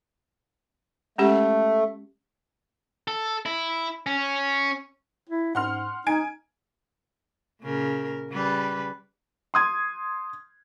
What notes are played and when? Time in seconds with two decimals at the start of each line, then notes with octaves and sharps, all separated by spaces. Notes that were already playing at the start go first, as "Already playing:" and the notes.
1.18 G#3 A3 C#4 G4
3.08 A4
3.46 E4
4.06 C#4
5.29 E4
5.55 G#2 F#5 C6 F6
6.06 D#4 G#5 G#6 D7
7.62 A#2 C#3 A#4
8.31 C#3 G3 B4
9.54 C6 D#6 G#6